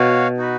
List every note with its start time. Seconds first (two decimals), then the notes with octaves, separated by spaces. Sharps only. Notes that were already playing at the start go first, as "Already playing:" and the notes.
Already playing: B2 F#4 C#5 F5
0.37 D#4 F#4 B4